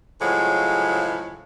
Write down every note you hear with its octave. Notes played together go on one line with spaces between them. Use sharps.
A2 C#3 F3 F#3 G#3